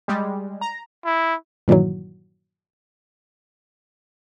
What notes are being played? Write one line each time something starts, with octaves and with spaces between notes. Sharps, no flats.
G3 G#3
A#5
E4
G2 A#2 D#3 E3 F#3